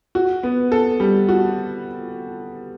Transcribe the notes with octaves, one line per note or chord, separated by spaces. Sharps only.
F#4
B3
A4
G3
F#4